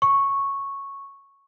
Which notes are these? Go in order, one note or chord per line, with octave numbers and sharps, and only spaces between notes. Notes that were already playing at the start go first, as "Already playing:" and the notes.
C#6